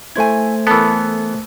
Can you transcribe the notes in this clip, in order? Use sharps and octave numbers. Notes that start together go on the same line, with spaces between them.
A3 E4 C5 G#5 G#6
E3 B3 A4 A#4